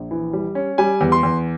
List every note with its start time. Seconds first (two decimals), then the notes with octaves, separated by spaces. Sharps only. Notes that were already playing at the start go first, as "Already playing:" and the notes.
Already playing: A#1
0.11 E3
0.33 G3
0.55 C#4
0.78 G3 G#5
1.01 E2
1.12 C6
1.23 E2